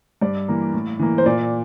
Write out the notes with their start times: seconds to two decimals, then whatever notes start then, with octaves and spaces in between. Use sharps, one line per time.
0.22 G2 D5
0.48 E3 A#3
0.73 A2
0.99 E3 A#3
1.18 C5
1.26 A#2 D5